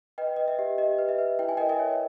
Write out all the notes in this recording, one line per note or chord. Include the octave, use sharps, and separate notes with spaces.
B4 D#5 G5
B4 D#5
E5
G4
G4 D#5
B4
E5
B4
E4 G5
G#5
A#4 D#5 G5
E5 G#5
C#5